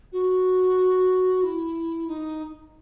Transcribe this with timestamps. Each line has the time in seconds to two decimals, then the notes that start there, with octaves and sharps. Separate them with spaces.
0.12 F#4
1.43 E4
2.07 D#4